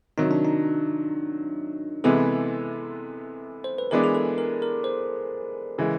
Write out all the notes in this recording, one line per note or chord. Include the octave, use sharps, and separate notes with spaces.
C3 D#3 F#3 D#4
D4
D#4
C3 E3 G#3 B3 A4
C5
B4
E3 G#3 B3 D4 A#4
G#4
A4
A#4
A#4
C5
C#3 E3 G#3